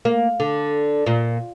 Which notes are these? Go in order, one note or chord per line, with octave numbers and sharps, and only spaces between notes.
A#3
D3
A#2